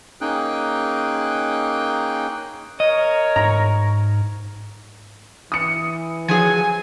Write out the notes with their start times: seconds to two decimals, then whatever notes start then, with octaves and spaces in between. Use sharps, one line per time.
0.21 A#3 C#4 D#4 G#4 G5 F#6
2.80 A#4 C#5 D#5
3.36 G#2 A#5
5.52 E3 D#6 C#7
6.28 F3 F#3 G#4 G#5